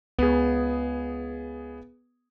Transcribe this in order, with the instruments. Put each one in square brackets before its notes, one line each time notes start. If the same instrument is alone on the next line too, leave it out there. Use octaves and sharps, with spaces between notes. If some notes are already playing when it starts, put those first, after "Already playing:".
[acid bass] C#2 [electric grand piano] B3 G#4